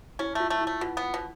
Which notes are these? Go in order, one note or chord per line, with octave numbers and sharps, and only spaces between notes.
C#4 E4
A3 F4
A3
E4
A3
B2 F4
B3
B2